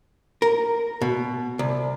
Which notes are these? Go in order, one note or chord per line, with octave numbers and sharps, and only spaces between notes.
A#4
B2
C2